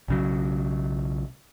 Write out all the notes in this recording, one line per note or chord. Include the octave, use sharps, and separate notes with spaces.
B1 C#3 F#3